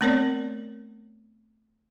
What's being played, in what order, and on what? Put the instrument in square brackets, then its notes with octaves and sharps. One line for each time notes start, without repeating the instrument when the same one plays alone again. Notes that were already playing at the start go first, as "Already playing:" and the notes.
[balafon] A3 B3 C4 A#4 C#5 D5